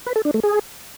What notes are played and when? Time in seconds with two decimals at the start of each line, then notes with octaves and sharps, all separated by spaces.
0.06 B4
0.16 A4
0.25 D4
0.34 A3
0.43 G#4